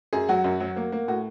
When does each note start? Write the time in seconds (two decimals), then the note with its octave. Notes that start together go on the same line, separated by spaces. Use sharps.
0.13 F#2 G#4
0.29 F#3 F#4
0.44 F#2
0.60 F#3
0.76 A#3
0.92 A#3
1.08 A2 F#4